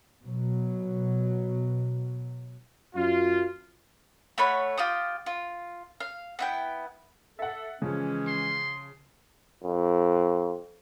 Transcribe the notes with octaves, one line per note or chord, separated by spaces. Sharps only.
B2 F#3
F#2 F4
A3 C#5 F#5 B5
F4 G4 G5 D#6
F4
F5
B3 E4 G5
A4 E5 F#5
C#3 E3 F3 G#3 C#4
C6
F2